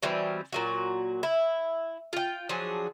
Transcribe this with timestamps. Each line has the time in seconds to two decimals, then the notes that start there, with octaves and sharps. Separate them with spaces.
0.03 B2 E3 G3 C4
0.52 A#2 F#3 F#4
1.23 E4
2.13 F4 G5
2.49 F3 F#3 D4 G#4